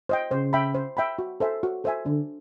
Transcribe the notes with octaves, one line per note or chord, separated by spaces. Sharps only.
C5 D#5 G5
C#3 C5
E5 G5 B5
C5
E5 G5 B5
F#4
A4 C5 E5 G#5
F#4
A4 C5 E5 G#5
D3 D4